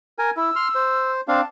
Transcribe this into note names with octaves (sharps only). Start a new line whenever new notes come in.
A#4 G#5
E4 E6
C6 F6
C5
C4 D4 F5 A5